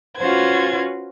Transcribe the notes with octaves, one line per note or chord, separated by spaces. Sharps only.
C#4 F4 F#4 B4 C5 G#6